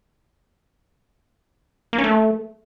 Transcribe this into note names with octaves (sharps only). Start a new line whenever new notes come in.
A#3
C#4
A3